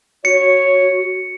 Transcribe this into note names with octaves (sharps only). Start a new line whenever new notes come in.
F#4 C#5 C#7